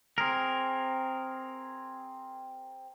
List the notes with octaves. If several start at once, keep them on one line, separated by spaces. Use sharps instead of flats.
C4 G#4 A#4